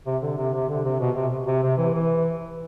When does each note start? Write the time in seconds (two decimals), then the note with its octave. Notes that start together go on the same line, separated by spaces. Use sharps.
0.06 C3
0.22 D3
0.38 C3
0.53 C3
0.69 D3
0.85 C3
1.00 B2
1.16 C3
1.47 C3
1.63 C3
1.77 E3
1.94 E3